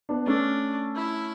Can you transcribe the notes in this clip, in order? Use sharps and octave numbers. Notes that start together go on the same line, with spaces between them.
B3 D4
A3 C#4 D4
E4